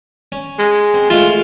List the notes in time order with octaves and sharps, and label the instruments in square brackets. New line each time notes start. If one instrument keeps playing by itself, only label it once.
[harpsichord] C#4
[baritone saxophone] G#3
[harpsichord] C4
[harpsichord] G#3 A3 E5 [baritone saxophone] F4